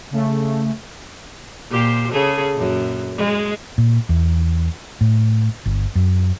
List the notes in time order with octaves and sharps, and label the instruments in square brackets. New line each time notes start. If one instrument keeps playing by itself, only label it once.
[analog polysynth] C#3 A3
[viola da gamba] A#2 G4 C5
C#3 G#4 A4
F#2 A#2
G#3
[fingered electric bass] A#2
E2
A2
G1
F#2